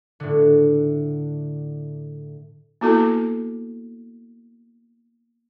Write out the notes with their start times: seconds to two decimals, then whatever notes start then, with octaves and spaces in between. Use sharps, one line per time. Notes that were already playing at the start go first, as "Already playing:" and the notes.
0.20 A2 D3
2.81 A#3 B3 E4 F#4 A4